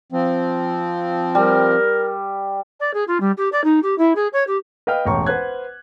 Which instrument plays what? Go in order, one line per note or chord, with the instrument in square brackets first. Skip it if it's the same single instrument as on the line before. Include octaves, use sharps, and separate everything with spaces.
[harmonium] F3 C4
[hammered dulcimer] G3 [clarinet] A#4
[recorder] D5
G#4
F4
G3
G4
D5
D#4
G4
E4
G#4
C#5
G4
[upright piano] B4 D#5 F5 G5 F6
E1 A1 G5 A#5 C6 C#6
B4 C5 F#5 F#6 G#6